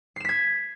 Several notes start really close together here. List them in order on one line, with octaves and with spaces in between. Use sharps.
C7 E7 B6 G#6